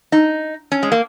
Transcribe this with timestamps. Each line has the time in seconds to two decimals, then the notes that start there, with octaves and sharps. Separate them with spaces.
0.12 D#4
0.72 C#4
0.83 G#3
0.92 A#3